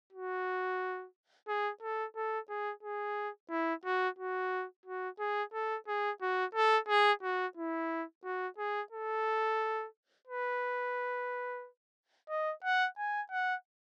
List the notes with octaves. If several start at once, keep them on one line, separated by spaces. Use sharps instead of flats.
F#4
G#4
A4
A4
G#4
G#4
E4
F#4
F#4
F#4
G#4
A4
G#4
F#4
A4
G#4
F#4
E4
F#4
G#4
A4
B4
D#5
F#5
G#5
F#5